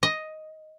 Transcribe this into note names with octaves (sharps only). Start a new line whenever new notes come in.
D#5